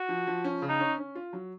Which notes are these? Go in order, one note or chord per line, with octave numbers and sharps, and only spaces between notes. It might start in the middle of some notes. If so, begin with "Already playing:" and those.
Already playing: F#4
F3
F3
C#4
C#3
D#4
C#4
C#4
F4
F#3